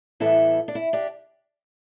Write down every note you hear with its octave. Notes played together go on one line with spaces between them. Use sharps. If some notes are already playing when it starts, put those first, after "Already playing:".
A2 E3 G3 B3 E4 A4
D4
E4
D4 G4